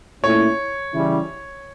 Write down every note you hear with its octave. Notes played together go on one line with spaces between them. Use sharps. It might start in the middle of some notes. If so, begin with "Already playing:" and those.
A#2 A3 C#4 E4 C#5
C#3 E3 G3 C#4 E4